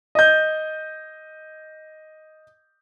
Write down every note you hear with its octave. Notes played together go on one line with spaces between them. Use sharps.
D#5 G6